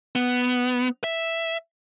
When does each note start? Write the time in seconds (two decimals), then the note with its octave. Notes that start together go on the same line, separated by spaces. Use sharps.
0.15 B3
1.04 E5